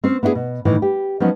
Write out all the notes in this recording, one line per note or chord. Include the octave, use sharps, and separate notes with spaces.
C4 C#4 C5
B3 D4 E4 F4 G#4
B2
A2 D#3 E3
G4
F3 F#3 B3 C#4 D#4